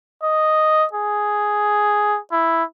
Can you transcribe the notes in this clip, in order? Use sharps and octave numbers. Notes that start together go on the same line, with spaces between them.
D#5
G#4
E4